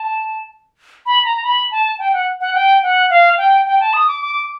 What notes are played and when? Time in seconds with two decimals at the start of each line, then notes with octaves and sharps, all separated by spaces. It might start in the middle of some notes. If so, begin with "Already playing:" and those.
Already playing: A5
1.06 B5
1.25 A#5
1.43 B5
1.71 A5
1.99 G5
2.13 F#5
2.41 F#5
2.55 G5
2.83 F#5
3.10 F5
3.38 G5
3.66 G5
3.80 A5
3.93 D#6
4.08 D6
4.21 D6